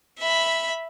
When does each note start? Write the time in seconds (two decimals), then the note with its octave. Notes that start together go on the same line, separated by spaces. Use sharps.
0.19 E5 B5